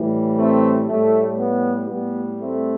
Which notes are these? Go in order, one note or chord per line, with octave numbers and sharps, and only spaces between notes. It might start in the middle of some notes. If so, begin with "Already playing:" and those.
Already playing: A2 E3 G3
A3 C4
A2 G3 A3
B3
A2 G3 B3
A3 C4